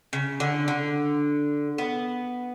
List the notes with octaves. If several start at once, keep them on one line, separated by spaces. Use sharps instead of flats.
C#3
D3
D3
B3